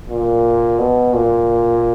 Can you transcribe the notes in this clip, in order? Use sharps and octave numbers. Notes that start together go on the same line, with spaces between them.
A#2
B2
A#2